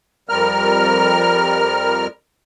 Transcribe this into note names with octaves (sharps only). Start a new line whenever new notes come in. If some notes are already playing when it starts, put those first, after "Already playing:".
F2 G3 A#4 F6